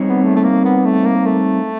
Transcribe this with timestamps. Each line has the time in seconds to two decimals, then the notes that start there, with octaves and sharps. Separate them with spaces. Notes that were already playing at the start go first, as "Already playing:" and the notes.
Already playing: G3 C4 D#4 G#4 C#5
0.09 B3
0.23 A3
0.36 A3
0.44 A#3
0.65 B3
0.85 A3
1.05 A#3
1.26 A3